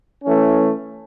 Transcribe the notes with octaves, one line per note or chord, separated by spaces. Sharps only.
E3 A3 C#4